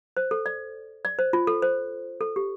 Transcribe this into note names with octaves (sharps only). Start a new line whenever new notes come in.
C5
A4
D5
D5
C5
F4
A4
C5
A4
G4